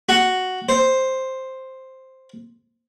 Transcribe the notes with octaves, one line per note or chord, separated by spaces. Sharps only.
F#4
C5